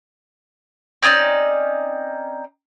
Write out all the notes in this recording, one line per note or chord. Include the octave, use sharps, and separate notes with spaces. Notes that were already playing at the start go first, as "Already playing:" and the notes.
C4 C#4 D#4 D5